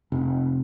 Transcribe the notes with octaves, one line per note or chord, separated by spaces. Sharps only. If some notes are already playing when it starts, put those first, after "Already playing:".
F1